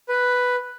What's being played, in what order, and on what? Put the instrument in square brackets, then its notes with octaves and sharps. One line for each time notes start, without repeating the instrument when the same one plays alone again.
[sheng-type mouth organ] B4